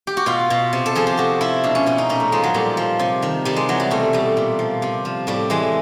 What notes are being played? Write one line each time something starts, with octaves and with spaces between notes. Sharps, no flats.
G4
F#4
B2 F4
B2
C3
A4
F3 G#4
G4
C3 F#4
F3 E4
B2 D4
C#4
B2 C#4
D#4
A#2 D#4
A3
F3 G#3
F#3
A#2 G3
F3
C3
D#3
C3 G3
G#3
E3 F#3
G3
B2 A3
B2 G3
A#2
F3
C3
F3
A2 G3
E3 G#3